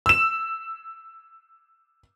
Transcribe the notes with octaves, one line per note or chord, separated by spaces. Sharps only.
E6 E7